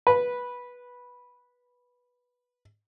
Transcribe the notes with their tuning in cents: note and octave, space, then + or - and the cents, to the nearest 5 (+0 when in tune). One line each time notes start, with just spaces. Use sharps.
B4 -10